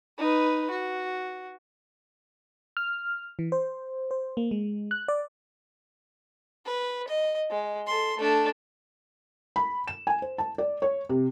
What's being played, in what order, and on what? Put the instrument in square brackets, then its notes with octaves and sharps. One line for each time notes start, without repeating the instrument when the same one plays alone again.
[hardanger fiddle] D#4 B4
F#4
[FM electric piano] F6
E3
C5
C5
A#3
G#3
F#6
D5
[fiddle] B4
D#5
G#3
A4 C6
A3 D4
[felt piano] B5
E7
G#5
C5
A5
D5
C#5
C3